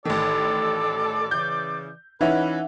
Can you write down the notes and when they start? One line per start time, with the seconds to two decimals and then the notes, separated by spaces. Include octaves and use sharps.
0.05 A1 D#3 A4 D5
1.31 C#3 E3 G6
2.21 E3 C#4 D#4 B4 E5 F#5